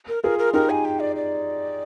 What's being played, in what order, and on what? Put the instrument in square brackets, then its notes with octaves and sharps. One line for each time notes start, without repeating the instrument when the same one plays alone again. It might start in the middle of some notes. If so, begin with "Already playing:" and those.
[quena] A#4
[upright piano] F4 G#4 [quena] A#4
[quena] A#4
[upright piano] D#4 G4 [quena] A#4
[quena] G#5
G5
D5
D5